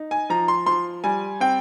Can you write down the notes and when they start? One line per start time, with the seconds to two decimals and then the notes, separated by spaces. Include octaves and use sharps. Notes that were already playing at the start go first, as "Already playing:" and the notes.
Already playing: D#4
0.11 G#5
0.30 F3 A#5
0.48 C6
0.66 F3 C6
1.04 G3 G#5
1.40 C4 G5